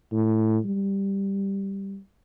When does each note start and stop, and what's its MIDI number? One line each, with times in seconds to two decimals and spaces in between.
0.13 0.58 45
0.65 1.99 55